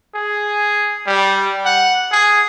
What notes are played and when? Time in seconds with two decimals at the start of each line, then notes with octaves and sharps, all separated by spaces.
0.15 G#4
1.07 G3
1.65 F#5
2.12 G#4